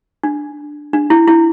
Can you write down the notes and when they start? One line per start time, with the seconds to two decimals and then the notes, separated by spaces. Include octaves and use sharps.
0.24 D4
0.93 D4
1.10 E4
1.28 E4